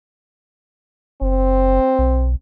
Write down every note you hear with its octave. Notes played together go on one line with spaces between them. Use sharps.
F#1 C4
B1